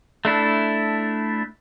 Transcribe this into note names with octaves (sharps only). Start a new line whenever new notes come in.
A3 D4 E4